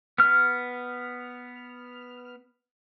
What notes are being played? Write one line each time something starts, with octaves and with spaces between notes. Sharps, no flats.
B3 F6